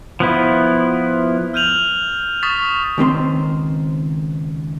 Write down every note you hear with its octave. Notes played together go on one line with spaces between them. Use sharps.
F3 B3 E4
E6 F6 G6 D#7 F7 F#7
C#6 D#6 A6 B6
C#2 D#3 C4 C6